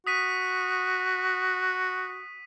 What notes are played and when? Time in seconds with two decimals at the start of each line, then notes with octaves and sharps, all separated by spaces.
0.07 F#4 D#6 B6 D#7